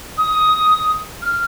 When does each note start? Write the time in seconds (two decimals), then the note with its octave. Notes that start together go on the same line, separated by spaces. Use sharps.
0.17 D#6
1.22 F6